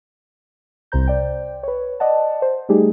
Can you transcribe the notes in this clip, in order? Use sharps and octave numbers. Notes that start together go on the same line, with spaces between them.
C2 C3 C5 A#5 G6
C5 D5 G5
B4 C#5
D5 D#5 F#5 A5
C5
G3 A3 D#4 G4 G#4